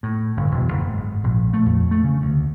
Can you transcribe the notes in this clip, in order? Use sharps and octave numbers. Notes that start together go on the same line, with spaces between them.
A2
G1
E1
F#1
G#2
A#1
A3
F2
A3
C#3
D2